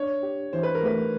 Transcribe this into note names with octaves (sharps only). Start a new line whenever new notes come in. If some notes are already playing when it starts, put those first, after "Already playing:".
Already playing: D4 C#5
G4
E3 C5
B4
A#4
A3 B4